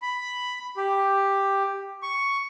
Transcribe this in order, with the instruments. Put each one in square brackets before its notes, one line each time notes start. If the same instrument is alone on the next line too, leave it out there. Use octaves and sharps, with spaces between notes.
[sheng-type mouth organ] B5
G4
C#6